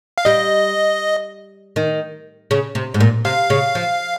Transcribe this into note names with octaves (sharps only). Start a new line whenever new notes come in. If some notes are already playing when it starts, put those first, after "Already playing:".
F5
G3 D#5
D#3
C#3
C3
G#2
A#2
C3 F5
C#3
F3